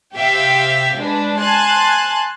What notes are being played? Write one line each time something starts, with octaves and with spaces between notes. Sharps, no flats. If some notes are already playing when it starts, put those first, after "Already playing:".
C3 G4 E5 F5 G5
G#3 D4 B4
G#5 A5 C6 F#6